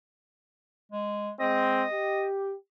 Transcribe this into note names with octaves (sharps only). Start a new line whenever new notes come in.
G#3
G#3 C4 D#5
G4